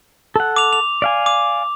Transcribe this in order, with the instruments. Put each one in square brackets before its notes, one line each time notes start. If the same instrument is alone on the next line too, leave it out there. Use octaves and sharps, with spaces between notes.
[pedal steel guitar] A4 F#5
[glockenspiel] D6 F7
F7
[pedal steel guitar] D5 F5 G#5
[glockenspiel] D6